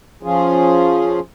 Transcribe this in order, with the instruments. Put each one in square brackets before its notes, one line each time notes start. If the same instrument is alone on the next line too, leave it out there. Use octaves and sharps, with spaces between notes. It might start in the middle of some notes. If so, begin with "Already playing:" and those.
[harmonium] F3 C#4 F4 G#4